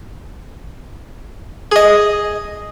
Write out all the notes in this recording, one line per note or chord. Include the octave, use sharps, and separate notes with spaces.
G#4 D#5